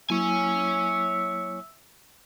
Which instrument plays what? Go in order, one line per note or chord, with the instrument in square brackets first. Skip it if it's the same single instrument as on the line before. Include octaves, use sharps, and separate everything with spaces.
[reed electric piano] F#3 A#3 E4 [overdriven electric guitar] C#5 G#5 [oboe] E5